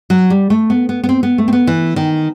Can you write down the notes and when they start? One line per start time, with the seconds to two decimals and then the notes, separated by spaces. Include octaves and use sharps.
0.10 F#3
0.30 G3
0.50 A3
0.70 B3
0.89 B3
1.04 B3
1.09 C4
1.23 B3
1.38 A3
1.48 C4
1.53 B3
1.67 E3
1.96 D#3